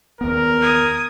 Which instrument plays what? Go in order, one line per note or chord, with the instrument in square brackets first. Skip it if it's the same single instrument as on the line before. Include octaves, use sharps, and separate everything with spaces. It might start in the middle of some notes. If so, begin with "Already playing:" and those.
[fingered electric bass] D#2 B3 [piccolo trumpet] A#4
[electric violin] D#6 G#6